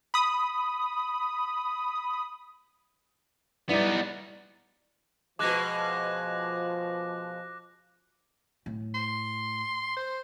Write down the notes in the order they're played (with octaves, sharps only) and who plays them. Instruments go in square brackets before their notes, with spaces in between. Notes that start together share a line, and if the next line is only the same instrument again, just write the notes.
[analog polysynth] B5 D#6
[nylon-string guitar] G3 E4 E5 [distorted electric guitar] B3 D#4 [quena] D5
[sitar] B2 G#3 [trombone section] F3 [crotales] D6 F#6 A#6
[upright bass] A2
[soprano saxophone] C6
C5